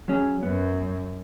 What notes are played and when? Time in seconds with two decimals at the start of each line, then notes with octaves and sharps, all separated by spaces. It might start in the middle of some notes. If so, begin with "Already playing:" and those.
0.08 F#3 C#4 G#4
0.43 F#2 B3